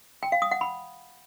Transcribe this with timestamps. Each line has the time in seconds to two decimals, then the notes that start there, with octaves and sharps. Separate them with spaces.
0.23 G5
0.32 F5
0.42 D#6
0.51 F#5
0.61 B5